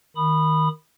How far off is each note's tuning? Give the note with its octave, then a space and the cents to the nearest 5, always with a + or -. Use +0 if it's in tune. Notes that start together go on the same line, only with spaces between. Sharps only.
D#3 +0 B5 +0 D#6 -25